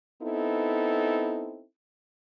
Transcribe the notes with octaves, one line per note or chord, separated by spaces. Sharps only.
B3 C4 D#4 E4 A4